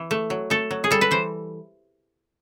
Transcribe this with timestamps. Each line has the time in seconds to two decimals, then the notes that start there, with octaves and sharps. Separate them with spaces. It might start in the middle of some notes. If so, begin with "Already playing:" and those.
Already playing: E3
0.11 A3
0.30 F#3
0.50 A3 A4
0.71 F#3
0.84 G#4
0.91 G3 A4
1.01 B4
1.11 E3 C5